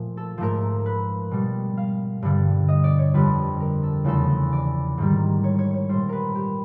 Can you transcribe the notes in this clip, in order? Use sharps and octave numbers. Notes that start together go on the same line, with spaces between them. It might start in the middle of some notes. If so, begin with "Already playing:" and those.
Already playing: A#2 F3 A3
A4
G#2 F3 A3 A#4
B4
B2 G3
F5
G2 D3 G3
D#5
D5
C#5
F2 D3 G3 B4
A#4
A4
E2 C#3 F3 A3 A4
D5
G#2 D#3 G3
C#5
C#5
C#5
A#2 G3 C5
A#4 B4
G4